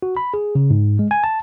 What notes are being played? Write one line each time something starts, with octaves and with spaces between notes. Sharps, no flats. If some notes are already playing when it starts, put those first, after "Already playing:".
F#4
B5
G#4
C#3
G#2
G#3
G#5
A5